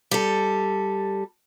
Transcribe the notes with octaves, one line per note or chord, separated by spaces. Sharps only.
G3 A4